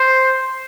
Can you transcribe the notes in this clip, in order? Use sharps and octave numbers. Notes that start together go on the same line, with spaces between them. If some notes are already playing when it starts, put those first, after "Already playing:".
Already playing: C5